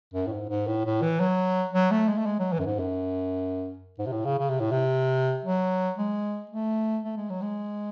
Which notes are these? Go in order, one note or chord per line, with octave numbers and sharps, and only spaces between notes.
F#2
A2
G#2
G#2
A2
A2
E3
F#3
F#3
A3
G#3
A3
G#3
F#3
E3
F#2
G#2
F#2
G#2
C3
A2
C#3
C#3
C3
A2
C3
F#3
G#3
A3
A3
G#3
F#3
G#3